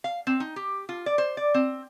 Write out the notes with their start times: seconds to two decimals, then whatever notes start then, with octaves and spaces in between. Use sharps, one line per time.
0.04 F5
0.27 C4
0.40 D#4
0.56 G4
0.89 F4
1.06 D5
1.18 C5
1.37 D5
1.54 C4